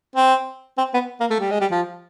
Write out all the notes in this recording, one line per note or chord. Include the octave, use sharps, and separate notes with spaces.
C4
C4
B3
A#3
A3
G3
G#3
G3
F3